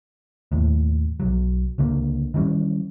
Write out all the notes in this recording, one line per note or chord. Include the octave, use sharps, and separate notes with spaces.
D#2 A2
B1 F#3
C#2 D3 A#3
D#3 E3 G3 C#4